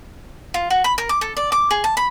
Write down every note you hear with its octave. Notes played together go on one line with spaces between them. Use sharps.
F4
F#4
B5
A#4
D6
A4
D5
D6
G#4
A5
B5